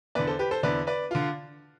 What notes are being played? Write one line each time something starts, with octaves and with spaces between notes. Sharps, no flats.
E2 D3 B4 D5
A4 C5
G4 B4
A4 C5
E2 D3 B4 D5
B4 D5
D3 F4